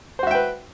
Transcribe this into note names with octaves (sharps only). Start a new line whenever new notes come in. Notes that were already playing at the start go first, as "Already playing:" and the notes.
F#4 B4 C5 E5 G5